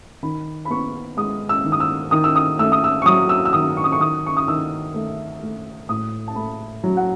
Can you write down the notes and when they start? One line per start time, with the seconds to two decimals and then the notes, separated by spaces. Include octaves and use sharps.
0.23 D#3 B5
0.65 B5
0.70 B3 C#6
1.17 G#3 D#6
1.49 E6
1.64 D#3
1.72 D#6
1.80 E6
2.11 D#3 D#6
2.24 E6
2.36 D#6
2.59 A3 E6
2.72 D#6
2.84 E6
3.02 C#6
3.06 F#3 D#6
3.29 E6
3.45 E6
3.53 D#3 D#6
3.77 C#6
3.84 D#6
3.92 C#6
4.00 D#3 D#6
4.26 C#6
4.37 D#6
4.48 D#3 E6
4.94 A3
5.42 A3
5.89 A2 D#6
6.28 A5
6.36 A3 B5
6.84 F#3
6.97 F#5